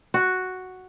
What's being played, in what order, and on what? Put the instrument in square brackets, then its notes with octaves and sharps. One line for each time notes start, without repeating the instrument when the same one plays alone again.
[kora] F#4